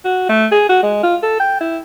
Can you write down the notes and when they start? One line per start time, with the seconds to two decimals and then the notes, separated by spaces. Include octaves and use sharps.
0.05 F#4
0.29 A3
0.52 G#4
0.69 F#4
0.83 G#3
1.03 F4
1.23 A4
1.40 G5
1.61 E4